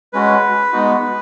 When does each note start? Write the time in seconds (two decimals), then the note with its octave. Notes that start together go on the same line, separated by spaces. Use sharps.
0.13 G#3 C#4 F#4 B4
0.73 G#3 B3 D#4 F#4